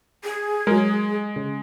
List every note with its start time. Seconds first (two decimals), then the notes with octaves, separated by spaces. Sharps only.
0.24 G#4
0.67 F#3 G#3 A#4
1.36 C#3